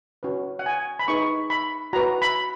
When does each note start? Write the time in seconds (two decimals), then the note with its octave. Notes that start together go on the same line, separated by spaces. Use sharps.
0.23 C#4 F#4 B4
0.59 F#5
0.66 G#5
0.99 B5
1.08 D#4 G#4 B4 C#6
1.50 B5
1.93 F#4 B4 A#5
2.22 B5